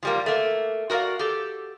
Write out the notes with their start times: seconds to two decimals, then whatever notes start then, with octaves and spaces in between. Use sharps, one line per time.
0.03 F3 G3 A#3
0.26 A3 A#3
0.90 F#4 A#4 B4 D5 F5
1.19 G4 A4